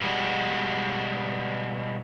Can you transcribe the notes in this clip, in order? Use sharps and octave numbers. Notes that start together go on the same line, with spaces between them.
B2 G3 G#3 F#4